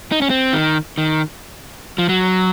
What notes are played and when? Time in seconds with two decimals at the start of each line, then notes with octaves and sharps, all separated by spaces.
0.12 D#4
0.22 C#4
0.30 C4
0.53 D#3
0.98 D#3
1.98 F3
2.09 F#3